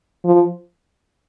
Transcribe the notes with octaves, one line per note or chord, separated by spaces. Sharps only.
F3